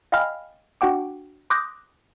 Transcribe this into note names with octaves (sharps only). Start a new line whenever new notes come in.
D#5 F5 G5 G#5 B5 F6
D4 F#4 F#5 G5 D6
C6 D6 D#6 F#6 G6 A#6